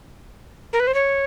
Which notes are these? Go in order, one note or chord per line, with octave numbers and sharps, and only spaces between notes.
A#4
B4
C5
C#5